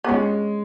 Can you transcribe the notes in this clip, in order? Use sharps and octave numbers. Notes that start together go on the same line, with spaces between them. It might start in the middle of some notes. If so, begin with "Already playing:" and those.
B3
G#3 C#4